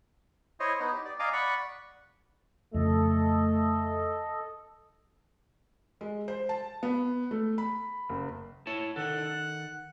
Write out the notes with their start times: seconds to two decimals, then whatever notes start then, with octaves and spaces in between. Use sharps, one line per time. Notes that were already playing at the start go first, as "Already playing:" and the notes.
0.60 E4 C5 C#5 D#5
0.80 B3 D#4
0.92 G4
1.05 D5
1.20 D5 D#5 F5 G#5 A#5 D6
1.33 D5 F#5 B5 C#6
2.74 F2 C#3 A3 A4 D#5
6.01 G#3
6.28 C5
6.49 A5
6.83 B3
7.31 A3
7.58 B5
8.09 F#1
8.67 E4 C#5 A5
8.96 D#3 A4 F#5